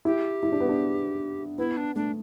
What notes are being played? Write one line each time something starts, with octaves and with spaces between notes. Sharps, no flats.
E4 G4
E4
D4
B3
D4
B3 E4
D4
A3 D4